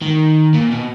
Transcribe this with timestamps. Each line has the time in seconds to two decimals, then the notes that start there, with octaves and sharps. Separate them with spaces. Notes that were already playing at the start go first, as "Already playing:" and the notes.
0.02 D#3
0.54 A#2
0.71 B2